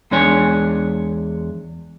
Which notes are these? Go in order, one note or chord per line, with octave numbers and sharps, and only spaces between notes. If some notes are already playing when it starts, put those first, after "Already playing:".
E2 G#3 D4 C#5 G#5